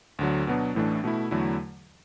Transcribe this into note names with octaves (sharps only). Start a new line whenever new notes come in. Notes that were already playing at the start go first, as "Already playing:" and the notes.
D2 D3 F#3
B2 F#3 B3 D4
A1 A2 E3 A3 D4
B2 A3 E4
E2 D3 F#3 A3 E4